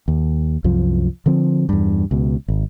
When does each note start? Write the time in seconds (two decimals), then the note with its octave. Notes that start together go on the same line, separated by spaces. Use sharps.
0.08 D#2
0.64 C2 F#2 F3
1.26 D3 F3 C4
1.69 E2 G2
2.11 C#2 B2
2.48 G#1